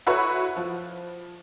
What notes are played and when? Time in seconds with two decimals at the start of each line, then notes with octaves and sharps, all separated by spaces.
0.07 E4 F#4 A4 B4 C#5 B5
0.57 F3